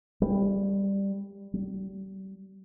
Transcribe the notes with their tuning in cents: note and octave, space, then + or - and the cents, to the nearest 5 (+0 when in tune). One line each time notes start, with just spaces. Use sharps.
G3 +10
G3 -35